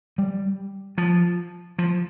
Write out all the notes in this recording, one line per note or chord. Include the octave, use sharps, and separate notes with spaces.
G3
F3
F3